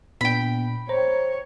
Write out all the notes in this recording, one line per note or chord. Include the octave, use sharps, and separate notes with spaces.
A#2 B3 D4 G5 B5
C5 C#5 A#5